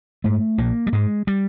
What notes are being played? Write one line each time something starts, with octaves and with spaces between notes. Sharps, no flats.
G#2 A3
A#1 A#3
G3
G#2 G#3
G3